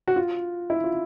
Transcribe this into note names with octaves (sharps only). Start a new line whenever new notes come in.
F#4
F4
E4
F4